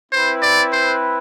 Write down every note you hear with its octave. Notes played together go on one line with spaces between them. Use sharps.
C4 E4 B4 C5
D5
C5